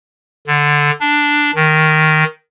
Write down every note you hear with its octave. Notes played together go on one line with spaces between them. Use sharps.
D3
D4
D#3